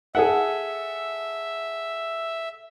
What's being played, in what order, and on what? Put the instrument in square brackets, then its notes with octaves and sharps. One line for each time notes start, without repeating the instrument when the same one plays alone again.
[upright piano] G#4 A4 F#5 [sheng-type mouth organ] E5